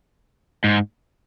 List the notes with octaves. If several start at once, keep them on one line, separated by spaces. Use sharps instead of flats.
G#2